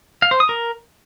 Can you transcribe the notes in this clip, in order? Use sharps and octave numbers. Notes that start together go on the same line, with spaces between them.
F5
C5
D#6
A#4